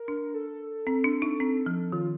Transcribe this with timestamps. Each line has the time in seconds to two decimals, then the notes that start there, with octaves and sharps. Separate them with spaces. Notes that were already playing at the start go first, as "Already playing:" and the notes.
Already playing: A#4
0.08 D4
0.34 A4
0.87 C4
1.04 D4
1.22 D#4
1.40 C4
1.66 F3
1.92 D#3 F4